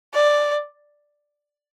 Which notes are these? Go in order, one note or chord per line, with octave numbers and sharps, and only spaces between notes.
D5